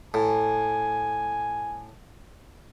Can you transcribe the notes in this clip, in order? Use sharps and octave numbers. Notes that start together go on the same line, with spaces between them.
A2 G#5